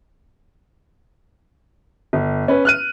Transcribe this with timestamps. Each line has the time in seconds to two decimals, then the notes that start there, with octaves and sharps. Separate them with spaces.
2.13 G1
2.48 C#4 B4
2.65 F6 F#6 D#7